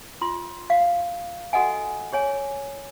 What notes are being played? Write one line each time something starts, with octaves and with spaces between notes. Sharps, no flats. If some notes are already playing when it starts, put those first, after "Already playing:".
F4 C6
F5
F#4 A4 D#5 F#5 G#5
G#4 C#5 G#5